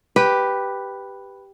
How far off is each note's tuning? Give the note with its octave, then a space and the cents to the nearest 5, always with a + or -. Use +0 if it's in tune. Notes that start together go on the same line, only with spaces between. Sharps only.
G4 +0 B4 +0